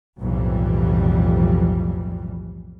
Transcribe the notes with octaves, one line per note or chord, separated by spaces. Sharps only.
B1 F2 A2 E3 G3